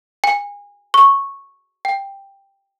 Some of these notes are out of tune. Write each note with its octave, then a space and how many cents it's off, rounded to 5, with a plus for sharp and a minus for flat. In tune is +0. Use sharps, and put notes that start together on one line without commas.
G#5 -30
C#6 -10
G5 +5